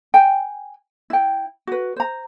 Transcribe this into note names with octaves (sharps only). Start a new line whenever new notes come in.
G5 G#5
E4 G5
F#4 B4
C5 A#5